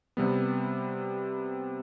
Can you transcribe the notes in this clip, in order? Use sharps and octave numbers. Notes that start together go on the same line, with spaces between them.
C3 G3 B3